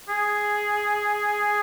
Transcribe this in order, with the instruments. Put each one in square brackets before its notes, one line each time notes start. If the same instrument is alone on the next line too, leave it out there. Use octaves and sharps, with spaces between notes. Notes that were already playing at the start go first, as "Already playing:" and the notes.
[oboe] G#4